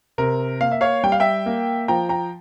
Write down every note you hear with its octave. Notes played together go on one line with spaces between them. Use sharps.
C3 A#4
A#3 F5
E5
C#5 F5
G3 G5
F5
E5 G5
A#3
F3 G5 A#5
G5 A#5